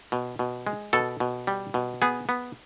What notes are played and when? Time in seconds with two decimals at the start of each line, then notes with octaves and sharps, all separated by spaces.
0.12 B2
0.39 B2
0.67 G#3
0.93 B2 A4
1.20 B2
1.47 G3
1.74 B2
2.02 B3 G#4
2.29 B3